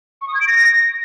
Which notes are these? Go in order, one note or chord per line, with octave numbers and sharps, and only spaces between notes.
C#6
D#6
G#6
D7
A#6